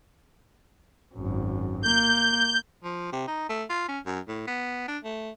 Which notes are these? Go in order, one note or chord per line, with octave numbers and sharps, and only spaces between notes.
G#1 F#2
A#3 G6
F3
C3
D#4
A3
F4
C#4
F#2
A2
B3
D4
A3